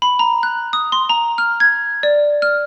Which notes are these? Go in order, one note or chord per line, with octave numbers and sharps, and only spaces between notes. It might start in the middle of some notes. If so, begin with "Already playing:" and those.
B5
A#5
F#6
D#6
C6
A#5
F6
G#6
D5
F6